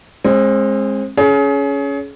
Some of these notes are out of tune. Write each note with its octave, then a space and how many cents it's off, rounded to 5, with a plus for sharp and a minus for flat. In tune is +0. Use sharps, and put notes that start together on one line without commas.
G#3 +0 C4 +35
C#4 +15 G#4 +30